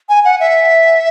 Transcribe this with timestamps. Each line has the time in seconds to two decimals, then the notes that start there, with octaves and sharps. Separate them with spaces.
0.09 G#5
0.25 F#5
0.40 E5